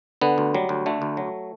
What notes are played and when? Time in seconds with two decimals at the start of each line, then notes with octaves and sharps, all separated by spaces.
0.22 D3 B3
0.38 D2
0.55 F#3 G3
0.69 D2
0.86 D3 A3
1.02 D2
1.17 F#3